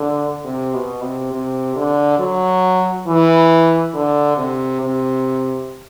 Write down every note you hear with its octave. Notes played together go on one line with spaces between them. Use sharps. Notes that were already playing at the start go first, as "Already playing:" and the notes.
Already playing: D3
C3
B2
C3
C3
D3
F#3
E3
D3
C3
C3